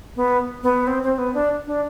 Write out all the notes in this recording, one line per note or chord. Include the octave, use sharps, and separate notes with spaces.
B3
B3
C4
C4
B3
D4
D4